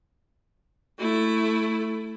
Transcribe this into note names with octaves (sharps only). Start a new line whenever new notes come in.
A3 E4